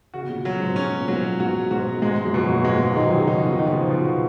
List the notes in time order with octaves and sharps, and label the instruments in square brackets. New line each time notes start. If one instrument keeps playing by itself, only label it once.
[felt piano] C#3 [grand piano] F#4
[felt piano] B2
A#2 C#3
[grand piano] F#3
[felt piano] G#2 B2
[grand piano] C#4
[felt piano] A#2
[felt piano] G#2 B2 [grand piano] F#3
[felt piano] G#2 B2 [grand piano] F#4
[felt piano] G#2 B2 [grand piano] F#4
[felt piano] G#2 [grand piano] G#3
[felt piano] F#2 A#2
[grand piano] B2
[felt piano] F#2 A#2
[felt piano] A#2 [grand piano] G#3
[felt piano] G#2
F3
[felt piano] D#3 F#3 [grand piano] D#4
[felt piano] F#3
C#3 F3
[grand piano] D#4
[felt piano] B2 D#3
[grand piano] D#4
[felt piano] C#3 F3
[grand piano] B2